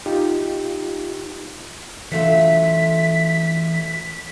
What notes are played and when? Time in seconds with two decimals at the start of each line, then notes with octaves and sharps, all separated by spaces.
0.06 D#4 F4 G4
2.12 E3 F#3 A3 D4 F4 B6